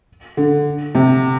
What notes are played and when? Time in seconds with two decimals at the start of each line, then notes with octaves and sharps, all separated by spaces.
0.37 D3
0.95 C3